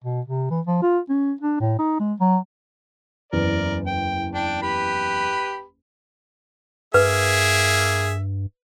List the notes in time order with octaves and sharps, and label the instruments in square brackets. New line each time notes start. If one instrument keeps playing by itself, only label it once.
[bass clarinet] B2
C3
E3
F3
F4
C#4
D4
A2
D#4
G#3
F#3
[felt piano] F#1 E2 [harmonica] A#4 D5
[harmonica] G5
D4 G5
G4 B4 B5
[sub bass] G2 [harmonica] A#3 E5 [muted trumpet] G#4 [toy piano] B4